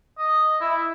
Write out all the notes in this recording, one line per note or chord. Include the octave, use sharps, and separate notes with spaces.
D#5
E4